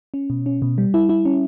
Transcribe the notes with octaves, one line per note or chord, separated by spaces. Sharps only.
C#4
B2
C#4
B2
G3
E4
E4
C#4